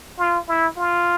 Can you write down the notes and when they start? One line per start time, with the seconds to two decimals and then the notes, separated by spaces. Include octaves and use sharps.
0.18 F4
0.48 E4
0.77 F4